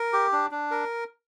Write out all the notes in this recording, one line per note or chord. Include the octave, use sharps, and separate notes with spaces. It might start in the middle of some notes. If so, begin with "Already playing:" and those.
Already playing: A#4
G4
D4
D4
A#4